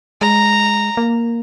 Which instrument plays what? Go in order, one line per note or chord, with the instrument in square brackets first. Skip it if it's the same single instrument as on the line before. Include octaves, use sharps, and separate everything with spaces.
[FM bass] G#3 [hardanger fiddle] A#5
[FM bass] A#3